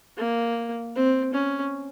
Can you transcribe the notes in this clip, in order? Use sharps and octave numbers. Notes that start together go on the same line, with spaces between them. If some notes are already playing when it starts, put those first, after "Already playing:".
A#3
C4
C#4